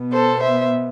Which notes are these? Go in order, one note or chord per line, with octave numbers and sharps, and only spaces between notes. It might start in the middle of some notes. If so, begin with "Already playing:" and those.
Already playing: B2 B3
A4 C5
C5 E5